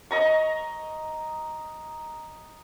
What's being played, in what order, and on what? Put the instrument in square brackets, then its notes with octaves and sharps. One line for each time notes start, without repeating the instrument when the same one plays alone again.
[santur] D#5 A#5 C#6